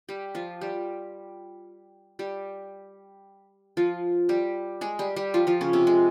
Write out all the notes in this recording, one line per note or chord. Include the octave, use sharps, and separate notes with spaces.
G3 G4
F3 F4
G3 G4
G3 G4
F3 F4
G3 G4
G#3 G#4
G3 G4
G3 G4
F3 F4
F3 F4
C#3 C#4
C3 C4
G#3